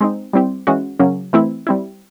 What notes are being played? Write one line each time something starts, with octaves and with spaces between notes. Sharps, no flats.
G#3 C4 D#4
G3 C4 E4 G4
E3 G#3 C#4 F#4
C#3 F#3 A#3 C#4
E3 A3 C4 E4
G3 C4 E4